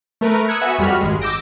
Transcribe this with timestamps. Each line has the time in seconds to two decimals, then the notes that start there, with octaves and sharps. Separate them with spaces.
0.21 A3 A#4 B4
0.48 D#6 E6 F#6 G#6 C#7
0.61 B3 F#4 E5 G#5 C#7
0.78 F2 G3 F#4 B5 F6
1.01 G#1 G#3
1.21 D6 E6 G6 A#6 D7